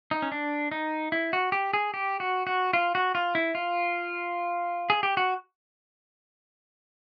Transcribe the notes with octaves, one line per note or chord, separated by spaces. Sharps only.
D#4
C#4
D4
D#4
E4
F#4
G4
G#4
G4
F#4
F#4
F4
F#4
F4
E4
F4
G#4
G4
F#4